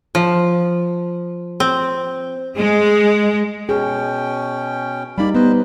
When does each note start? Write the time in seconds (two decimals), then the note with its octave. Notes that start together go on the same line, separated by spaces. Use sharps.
0.15 F3
1.60 C4
2.57 G#3
3.69 B2 C#4 G#4 G5
5.18 G3 A#3 D#4 D5 B5
5.35 B3 B4 C5 D#5